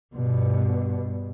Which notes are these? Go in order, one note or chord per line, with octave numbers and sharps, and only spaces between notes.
G2 B2